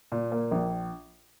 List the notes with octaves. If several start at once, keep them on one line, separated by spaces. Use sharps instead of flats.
A#2
A#3
A#1